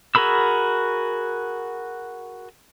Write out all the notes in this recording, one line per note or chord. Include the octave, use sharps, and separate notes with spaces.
F#4 G#4 A#4 B5 E6